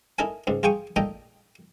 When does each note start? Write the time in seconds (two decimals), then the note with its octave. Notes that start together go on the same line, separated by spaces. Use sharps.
0.19 D#4 E4 A4 A#4 G#5
0.47 C#2 G#2
0.63 F4 G#4 G5 C#6 D#6
0.96 A#2 D#4 A4 D#5 G5 A#5